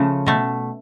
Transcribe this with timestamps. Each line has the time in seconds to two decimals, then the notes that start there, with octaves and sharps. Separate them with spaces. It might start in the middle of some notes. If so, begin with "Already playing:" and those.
Already playing: C#3 F3 A3
0.27 B2 A3